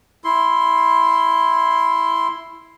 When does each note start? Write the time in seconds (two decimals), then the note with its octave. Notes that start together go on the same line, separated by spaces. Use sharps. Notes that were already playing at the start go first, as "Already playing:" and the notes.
0.24 E4 C6